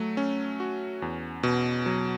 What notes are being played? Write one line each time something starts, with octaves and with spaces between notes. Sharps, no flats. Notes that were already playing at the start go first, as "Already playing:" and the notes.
Already playing: F#3 A3
C#4
F#4
E2
B2
F#3